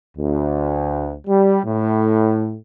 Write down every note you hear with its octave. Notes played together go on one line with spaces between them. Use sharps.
D2
G3
A2